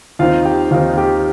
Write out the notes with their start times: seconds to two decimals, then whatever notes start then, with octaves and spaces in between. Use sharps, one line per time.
0.19 D#2 D#3 C4 D#4 F4 F5
0.45 G4 G5
0.71 D#2 D#3 C4 D#4 F4 F5
0.97 G4 G5